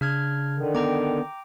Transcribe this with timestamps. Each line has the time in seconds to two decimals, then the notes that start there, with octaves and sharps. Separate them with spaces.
0.01 C#3 D4 F6 G#6
0.57 D3 D#3
0.75 B3 G5 A#5 D6